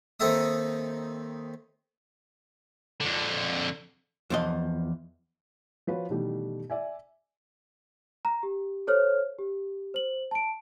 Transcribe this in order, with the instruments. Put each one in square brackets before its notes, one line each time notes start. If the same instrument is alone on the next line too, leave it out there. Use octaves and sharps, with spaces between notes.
[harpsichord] D#2 C4 D#4 A4 E5 D#6
[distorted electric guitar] F2 D3
[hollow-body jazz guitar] E2 F3 D#5
[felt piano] F3 F#4 B4 C#5
B2 D#3 E3 G3 A3 G4
D5 E5 G#5
[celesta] A#5
G4
A4 C5 C#5 F6
G4
C5 F#7
A5 D7